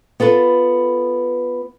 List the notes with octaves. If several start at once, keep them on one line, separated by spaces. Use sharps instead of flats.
B3 F4 A4 B4